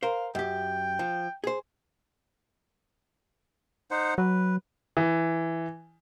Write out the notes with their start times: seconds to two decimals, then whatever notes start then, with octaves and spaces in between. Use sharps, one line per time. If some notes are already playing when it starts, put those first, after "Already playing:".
0.03 A#4 C5 F5
0.35 F#2 G4 G5
0.99 F3
1.44 G#4 C5
3.91 D#4 C5 F#5
4.18 F#3 B4
4.97 E3